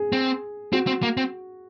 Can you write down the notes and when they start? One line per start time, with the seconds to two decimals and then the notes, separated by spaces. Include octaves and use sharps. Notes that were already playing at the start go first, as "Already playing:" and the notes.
Already playing: G#4
0.12 C4
0.73 C4 F#4
0.87 C4
1.03 A#3
1.17 C4